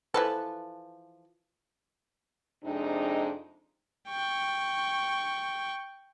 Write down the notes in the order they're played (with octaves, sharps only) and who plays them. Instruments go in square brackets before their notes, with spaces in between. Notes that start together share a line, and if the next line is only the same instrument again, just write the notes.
[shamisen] E3 F3 A4 [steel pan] B4
[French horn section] F2 C3 G#3 D4 D#4
[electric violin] G5 C#6